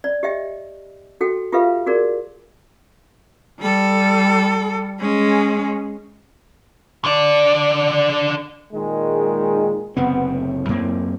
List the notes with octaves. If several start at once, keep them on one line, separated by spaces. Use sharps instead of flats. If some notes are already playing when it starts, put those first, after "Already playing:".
D5
G4 D#5 E5 G5
F#4 A4 G5
F4 G4 A4 B4 E5 F5
F#4 G#4 A#4 D5
G3 A4
G#3 C#4
D3 D5
A#2 D#3 G#3
F#1 C3 B3 C4
A2
F#2 A#3 C4